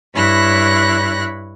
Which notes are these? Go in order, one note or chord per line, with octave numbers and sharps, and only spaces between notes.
G2 E4 C#5 B5 F#6 A#6